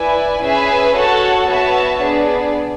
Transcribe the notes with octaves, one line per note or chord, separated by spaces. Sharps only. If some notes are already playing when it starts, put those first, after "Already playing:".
Already playing: E4 B4 D5 G#5
C#4 G#4 B4 E5 G#5
F#4 A4 C#5 F#5 A5
B3 F#4 C#5 E5 A5
B3 D4 G#4 D5